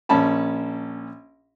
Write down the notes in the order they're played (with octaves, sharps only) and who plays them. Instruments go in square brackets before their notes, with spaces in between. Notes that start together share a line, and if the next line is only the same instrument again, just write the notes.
[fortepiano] A#1 C#4 A5 B5